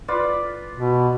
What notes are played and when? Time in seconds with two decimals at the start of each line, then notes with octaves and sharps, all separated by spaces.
0.08 F4 B4 D5
0.74 B2